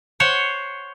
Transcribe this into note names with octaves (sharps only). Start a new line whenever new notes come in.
C5 C#5 F#5